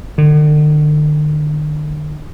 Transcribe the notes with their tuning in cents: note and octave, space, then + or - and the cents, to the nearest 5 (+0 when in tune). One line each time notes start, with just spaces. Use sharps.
D3 +45